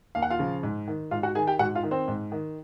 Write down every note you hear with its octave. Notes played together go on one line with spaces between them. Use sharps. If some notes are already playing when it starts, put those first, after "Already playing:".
D#2 F5
F#5
F4 F5
C#3 F3
G#2
D#3
G#2 F4 F5
F#4 F#5
D#3 G#4 G#5
G4 G5
G#2 F#4 F#5
F4 F5
D#3
C4 C5
G#2
D#3